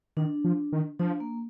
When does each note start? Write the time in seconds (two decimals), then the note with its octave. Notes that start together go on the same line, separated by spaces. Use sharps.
0.17 D#3 D4
0.44 F3
0.73 D#3
0.99 F3 D4
1.20 A#3